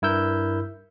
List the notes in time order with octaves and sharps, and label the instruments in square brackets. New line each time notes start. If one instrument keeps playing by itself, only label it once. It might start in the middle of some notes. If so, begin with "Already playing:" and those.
[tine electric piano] G2 E4 A#4 E6 G6